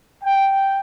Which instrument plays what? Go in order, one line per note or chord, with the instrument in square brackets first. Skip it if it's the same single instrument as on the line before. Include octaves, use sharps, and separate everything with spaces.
[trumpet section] G5